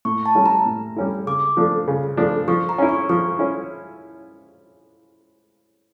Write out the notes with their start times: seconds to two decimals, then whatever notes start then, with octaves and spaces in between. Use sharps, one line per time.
0.05 A2 C#6
0.26 A5
0.35 G3 C#4 E4
0.46 A#5
0.65 A2
0.96 G3 C#4 E4
1.26 C#3 D6
1.57 F3 A3 D4
1.88 C#3
2.17 F3 A3 D4
2.48 F3 C#6
2.69 A#5
2.78 C#4 E4
2.89 C#6
3.09 F3 C#6
3.39 C#4 E4